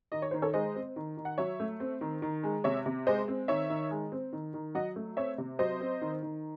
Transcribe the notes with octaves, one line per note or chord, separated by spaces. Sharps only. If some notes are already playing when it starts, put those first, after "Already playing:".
D#3 D#5
C#5
D#3 C5
A4 C#5
G#3 C5 D#5
C4
D#3
D#3
F#5
F#3 C#5 E5
A3
C4
D#3
D#3
G#3
C3 C#5 E5
C3
G#3 C5 D#5
C4
D#3 C#5 E5
D#3
G#3
C4
D#3
D#3
F#3 D#5 F#5
A3
C4 C#5 E5
C3
F#3 C5 D#5
C4
D#3
D#3